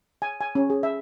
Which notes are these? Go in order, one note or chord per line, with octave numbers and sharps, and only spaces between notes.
G#5
G#5
C#4
G#4
E5